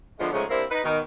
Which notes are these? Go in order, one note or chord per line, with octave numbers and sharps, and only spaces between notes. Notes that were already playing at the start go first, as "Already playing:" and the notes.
D3 F3 G#3 A3 B3
G#2 C#3 F3 G#3 A3
C3 A#3 C4 D4 E4
D#4 B4
B2 D#3